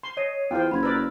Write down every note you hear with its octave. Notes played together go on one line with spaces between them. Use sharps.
C6
C#5 D#5 C7 D#7
E2 F4 C5 G5
F#1 B3 B5 C6 G#6
A#4 B4 D5 E6